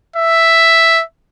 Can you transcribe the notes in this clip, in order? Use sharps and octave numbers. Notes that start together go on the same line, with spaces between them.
E5